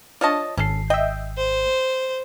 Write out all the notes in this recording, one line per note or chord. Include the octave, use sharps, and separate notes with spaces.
D4 F4 C#5 D#5 A5
G#1 C#4 A4 C7
D#5 E5 G5
C5